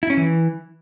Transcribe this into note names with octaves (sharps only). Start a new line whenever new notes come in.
E4
C#4
E3